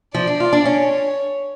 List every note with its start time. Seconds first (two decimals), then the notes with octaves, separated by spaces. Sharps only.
0.14 F3 D5
0.27 D4
0.40 F4
0.53 D4
0.65 C#4 C#5